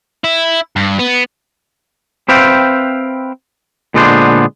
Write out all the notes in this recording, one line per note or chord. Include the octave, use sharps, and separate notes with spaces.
E4
G2
B3
C4 B4 C5 E5 F5 G5
A#2 D3 G#3 B3 D4 C5